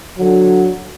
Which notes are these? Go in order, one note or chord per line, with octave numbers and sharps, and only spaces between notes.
D3 F#3